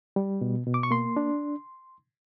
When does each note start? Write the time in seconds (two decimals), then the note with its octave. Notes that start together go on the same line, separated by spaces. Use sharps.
0.16 G3
0.41 B2
0.67 B2
0.74 D6
0.83 C#6
0.91 A#3 C6
1.17 D4